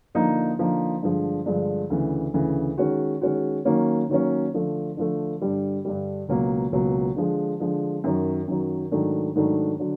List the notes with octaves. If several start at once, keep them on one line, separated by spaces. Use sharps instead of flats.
D3 F3 A#3 D#4
D3 F3 A#3 D#4
G2 D3 F3 G#3
G2 D3 F3 G#3
D2 C#3 E3
D2 C#3 E3
D#3 G#3 C#4 F#4
D#3 G#3 C#4 F#4
D#3 F#3 A#3 C#4
D#3 F#3 A#3 C#4
D3 F3 A3
D3 F3 A3
G2 D3 G3
G2 D3 G3
C#2 B2 F#3 A#3
C#2 B2 F#3 A#3
D3 F3 G#3
D3 F3 G#3
F#2 D#3 F#3
F#2 D#3 F#3
G#2 D#3 F#3 A3 D4
G#2 D#3 F#3 A3 D4
D3 F#3